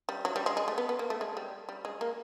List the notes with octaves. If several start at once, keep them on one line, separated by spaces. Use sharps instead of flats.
G3
F#3
G3
G#3
G#3
A3
B3
B3
A#3
A3
G#3
G3
G3
G#3
A#3